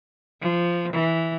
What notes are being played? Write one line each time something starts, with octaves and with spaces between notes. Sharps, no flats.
F3
E3